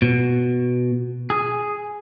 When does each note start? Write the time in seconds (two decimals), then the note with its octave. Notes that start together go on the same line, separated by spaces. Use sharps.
0.02 B2
1.30 G#4